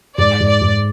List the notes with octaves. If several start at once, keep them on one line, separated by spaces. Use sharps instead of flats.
G#2 D5
G#2
D5
G#2